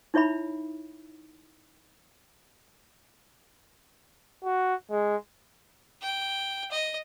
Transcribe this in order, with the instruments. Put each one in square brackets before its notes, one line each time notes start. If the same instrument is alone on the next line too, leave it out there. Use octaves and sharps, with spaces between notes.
[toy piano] D#4 E4 C#5 E5 B5
[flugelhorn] F#4
G#3
[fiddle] G5
D#5